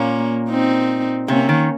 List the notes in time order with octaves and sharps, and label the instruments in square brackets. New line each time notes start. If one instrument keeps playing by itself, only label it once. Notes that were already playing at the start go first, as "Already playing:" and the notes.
Already playing: [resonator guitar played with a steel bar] A#2 [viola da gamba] A#3 C#4
[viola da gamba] C4 D#4
[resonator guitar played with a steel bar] C3 [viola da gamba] A#3 C#4
[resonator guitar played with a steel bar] D#3